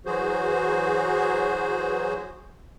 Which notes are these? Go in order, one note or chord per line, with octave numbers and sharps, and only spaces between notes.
E3 F#3 F#4 G#4 C5